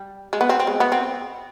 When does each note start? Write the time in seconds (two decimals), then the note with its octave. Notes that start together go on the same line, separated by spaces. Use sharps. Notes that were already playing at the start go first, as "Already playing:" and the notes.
Already playing: G3
0.33 G#3
0.41 B3
0.49 C4
0.60 C4
0.67 G#3
0.80 B3
0.92 C4